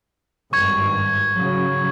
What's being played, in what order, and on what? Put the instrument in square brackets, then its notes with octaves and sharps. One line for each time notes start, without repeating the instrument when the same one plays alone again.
[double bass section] G#1 G2 [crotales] C#6 G#6
[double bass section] C#3 F#3